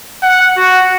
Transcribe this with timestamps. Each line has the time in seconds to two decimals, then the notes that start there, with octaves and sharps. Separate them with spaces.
0.23 F#5
0.57 F#4